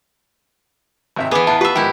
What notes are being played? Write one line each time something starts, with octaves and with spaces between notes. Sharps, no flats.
G#1 C3 E5
E3 B3 G#4 G#5 D6
E2 E4 F4 A5
G4 B4 E5
G#2 D#3 F3 E4 G4 G5